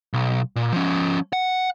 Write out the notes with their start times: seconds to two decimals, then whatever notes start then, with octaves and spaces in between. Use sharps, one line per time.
0.13 B1
0.56 A#2
0.72 F3 C#4
1.33 F#5